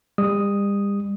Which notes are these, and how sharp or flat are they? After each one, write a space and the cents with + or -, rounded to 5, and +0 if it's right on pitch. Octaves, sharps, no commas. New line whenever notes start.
G3 +40 D#6 +0